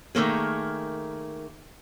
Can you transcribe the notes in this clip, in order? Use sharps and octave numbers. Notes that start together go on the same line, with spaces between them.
D#3 A3 A#3 G#4